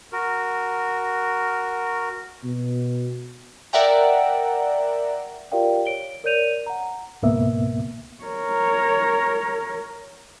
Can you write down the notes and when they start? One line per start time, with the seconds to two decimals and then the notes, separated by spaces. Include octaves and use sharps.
0.12 F#4 A#4
2.44 B2
3.73 A#4 D5 E5 F#5 G5 A#5
5.52 F4 G4 A#4 D5 F5 G5
5.85 C#5 D7 G7
6.24 A#4 C#5 D5 G6 D#7 F7
6.66 F#5 A#5
7.22 C#2 G#2 B2 A#3 B3 E5
8.24 A#4 C#5